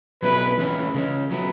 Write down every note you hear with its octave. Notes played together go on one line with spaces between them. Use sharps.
B1 B2 F#3 E4 B4
E3 G#3 C#4 E4 B4
C#3 G#3 C#4
F#3 B3 E4